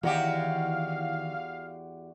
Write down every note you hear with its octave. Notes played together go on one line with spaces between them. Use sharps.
E2 D#3 E3 F#4 G4 F5